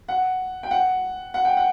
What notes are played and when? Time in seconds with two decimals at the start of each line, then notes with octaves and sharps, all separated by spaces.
0.08 F#5
0.63 G5
0.71 F#5
1.34 F#5
1.45 G5
1.57 F#5